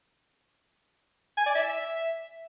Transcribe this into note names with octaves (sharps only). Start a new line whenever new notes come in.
G#5
D5
E5